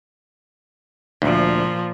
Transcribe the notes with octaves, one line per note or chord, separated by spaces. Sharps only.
D2 A#2 F3